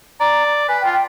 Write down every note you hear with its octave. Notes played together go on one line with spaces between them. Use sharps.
D5 A#5
B4 G#5
G5
F4
G5